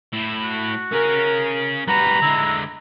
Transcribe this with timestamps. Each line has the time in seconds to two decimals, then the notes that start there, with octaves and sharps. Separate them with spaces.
0.13 A2 E4
0.43 F#4
0.92 C#4 G#4 A#4
1.88 G3 F#4 B4 A#5
2.22 D3 G#3 E4